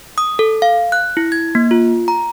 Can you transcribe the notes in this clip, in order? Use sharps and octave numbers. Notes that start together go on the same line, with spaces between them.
D#6
A4
F5
F#6
E4
G#6
A#3
F4
A#5